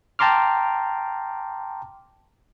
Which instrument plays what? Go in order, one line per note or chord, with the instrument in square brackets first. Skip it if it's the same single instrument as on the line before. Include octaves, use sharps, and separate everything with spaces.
[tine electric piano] G5 A5 A#5 C6 D6 F6